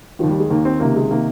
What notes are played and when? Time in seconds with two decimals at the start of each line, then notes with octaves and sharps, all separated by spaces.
0.19 D#2 D#3 F3
0.30 G3
0.40 G#3
0.50 D#2 D#3 A#3
0.65 C4
0.80 C#2 C3 D#3 A#3
0.96 G#3
1.11 C3 D#3 A#3